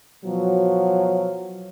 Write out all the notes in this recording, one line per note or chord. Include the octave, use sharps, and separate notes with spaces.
B2 F3 F#3